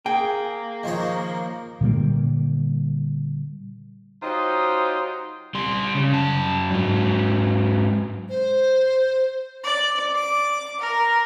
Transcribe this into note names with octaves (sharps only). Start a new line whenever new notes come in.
A#3 G#4 G5
D#3 F3 C#5
A#2 D3 G3 A#3
F#3 D#4 F4 G4 C5 D#5
G3 C6
C#3
F#2 A5
G#2 F#3
C5
D5
D6
A#4